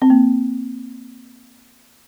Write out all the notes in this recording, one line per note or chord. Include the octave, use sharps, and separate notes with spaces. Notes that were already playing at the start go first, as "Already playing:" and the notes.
C4
A#3